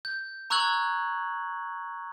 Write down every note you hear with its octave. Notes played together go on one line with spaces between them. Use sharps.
G6
A#5 C#6 E6 F#6 G#6 F#7